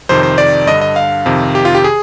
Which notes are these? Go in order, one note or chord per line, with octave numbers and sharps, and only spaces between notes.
F2 C3 D#3 C5
C5
D5
G2 D3 D#5
D#5
F5
F2 C3 D#3
G4
F4
G4
G#4